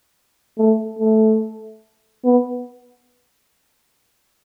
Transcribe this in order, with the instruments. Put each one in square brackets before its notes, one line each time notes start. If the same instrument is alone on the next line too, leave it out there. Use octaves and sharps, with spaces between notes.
[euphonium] A3
A3
B3